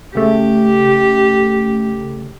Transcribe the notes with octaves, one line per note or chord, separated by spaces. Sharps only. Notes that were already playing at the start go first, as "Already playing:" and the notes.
C#3 A3 G4